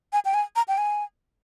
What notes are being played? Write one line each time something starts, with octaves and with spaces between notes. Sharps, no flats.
G#5
G5
G#5
A#5
G5
G#5